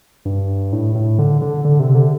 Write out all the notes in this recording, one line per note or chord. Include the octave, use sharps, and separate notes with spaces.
G2
A2
A2
D3
D3
D3
C3
D3